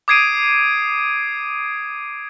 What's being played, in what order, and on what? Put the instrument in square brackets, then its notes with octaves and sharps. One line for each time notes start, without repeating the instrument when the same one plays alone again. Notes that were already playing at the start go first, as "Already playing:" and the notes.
[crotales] D6 D#6 G#6 C7 D7 D#7